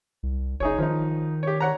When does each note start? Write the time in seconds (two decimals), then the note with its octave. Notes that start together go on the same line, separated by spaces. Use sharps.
0.23 C2
0.60 F#1 D#4 G#4 C#5
0.78 D#3 F3 D#4
1.43 G4 C#5
1.60 C#5 F#5 A#5